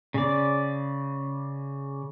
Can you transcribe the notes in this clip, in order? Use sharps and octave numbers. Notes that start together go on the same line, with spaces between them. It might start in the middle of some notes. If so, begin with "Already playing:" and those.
C#3 D5